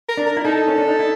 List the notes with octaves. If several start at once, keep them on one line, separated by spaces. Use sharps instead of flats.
A#4
D4
A#4
E4
D#4 A4
C#4
D4
D#4
E4